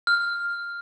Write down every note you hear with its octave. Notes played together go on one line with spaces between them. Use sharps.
F6